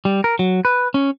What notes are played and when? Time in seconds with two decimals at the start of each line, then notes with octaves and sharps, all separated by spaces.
0.05 G3
0.24 A#4
0.39 F#3
0.65 B4
0.94 C#4